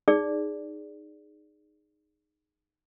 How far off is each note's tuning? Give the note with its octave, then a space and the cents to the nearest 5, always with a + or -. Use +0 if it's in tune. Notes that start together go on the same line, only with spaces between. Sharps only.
D#4 -15 G#4 +0 D5 -10